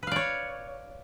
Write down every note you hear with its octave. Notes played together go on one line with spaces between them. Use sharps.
B4 C#5 D5 F5